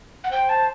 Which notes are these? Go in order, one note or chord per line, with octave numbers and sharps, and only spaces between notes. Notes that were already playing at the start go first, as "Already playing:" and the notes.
F#5
C5 G5
A5